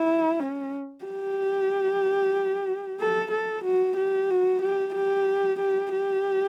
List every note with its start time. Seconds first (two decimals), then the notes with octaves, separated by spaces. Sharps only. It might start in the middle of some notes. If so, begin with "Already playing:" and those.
Already playing: E4
0.40 C#4
1.05 G4
3.00 A4
3.32 A4
3.64 F#4
3.97 G4
4.30 F#4
4.62 G4
4.95 G4
5.60 G4
5.93 G4